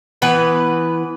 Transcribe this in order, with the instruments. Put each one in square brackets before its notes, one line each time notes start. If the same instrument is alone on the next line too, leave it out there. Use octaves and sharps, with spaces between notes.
[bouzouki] E3 B3 B4